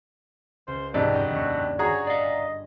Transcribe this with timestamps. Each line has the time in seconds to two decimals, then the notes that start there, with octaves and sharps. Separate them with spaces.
0.67 C#2 C5
0.94 F2 G#2 C3 D#4 F#4 D5
1.13 G1 D#5 G5
1.31 D#2 D4 C#6
1.79 F#4 G#4 C#5 A#5
2.07 D5 D#5 F5